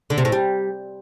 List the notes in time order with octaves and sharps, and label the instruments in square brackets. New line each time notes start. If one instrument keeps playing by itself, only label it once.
[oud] D3
C3
A2
G3